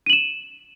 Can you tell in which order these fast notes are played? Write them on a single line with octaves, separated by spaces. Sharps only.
D#7 F#7 E7